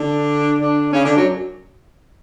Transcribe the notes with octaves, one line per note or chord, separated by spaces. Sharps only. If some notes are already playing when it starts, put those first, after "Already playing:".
Already playing: D3 D4
D3 D4
C#3 C#4
D3 D4
F#2 F#3